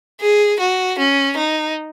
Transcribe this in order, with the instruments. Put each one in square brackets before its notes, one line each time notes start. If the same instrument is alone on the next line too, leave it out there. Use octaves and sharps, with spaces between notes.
[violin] G#4
F#4
C#4
D#4